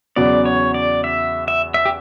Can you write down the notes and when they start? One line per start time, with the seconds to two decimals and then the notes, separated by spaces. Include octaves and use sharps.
0.16 E2 C#3 F#3 B3 D5
0.45 C#5
0.74 D5
1.04 E5
1.48 E5
1.74 E5
1.85 G4